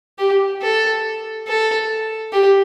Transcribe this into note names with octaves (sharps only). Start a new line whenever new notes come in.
G4
A4
A4
G4